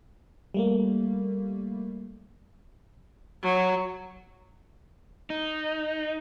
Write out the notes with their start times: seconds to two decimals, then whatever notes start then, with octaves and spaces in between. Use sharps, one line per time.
0.54 G3 A3 A#3
3.43 F#3
5.30 D#4